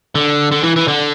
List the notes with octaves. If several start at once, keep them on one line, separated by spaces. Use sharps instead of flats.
D3
D3
E3
E3
D3